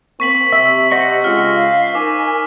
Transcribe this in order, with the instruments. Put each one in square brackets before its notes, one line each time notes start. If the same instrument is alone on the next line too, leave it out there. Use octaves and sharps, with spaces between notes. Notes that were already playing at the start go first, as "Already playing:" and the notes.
[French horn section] A#3 C4 [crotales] C#6 B6 F#7
[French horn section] C3 [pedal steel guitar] E5 [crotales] E6
[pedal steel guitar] C5 D#5 C#6 [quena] F#5
[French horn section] C#3 G#3 F4 [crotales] F6
[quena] F5
[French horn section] D#4 A#4 [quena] G#5 [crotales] D6